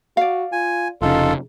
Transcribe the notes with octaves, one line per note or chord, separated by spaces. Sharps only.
F#4 D5 F5
F4 G#5
F1 C#3 D#4 F4 A4